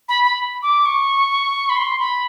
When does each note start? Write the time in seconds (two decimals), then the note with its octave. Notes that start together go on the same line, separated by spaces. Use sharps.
0.09 B5
0.24 B5
0.63 D6
0.86 C#6
1.70 B5
1.77 C6
1.99 B5